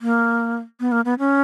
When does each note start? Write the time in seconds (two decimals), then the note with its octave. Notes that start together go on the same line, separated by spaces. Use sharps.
0.01 A#3
0.80 B3
0.92 A#3
1.05 B3
1.19 C#4